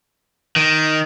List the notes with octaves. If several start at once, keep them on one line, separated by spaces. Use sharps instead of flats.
D#3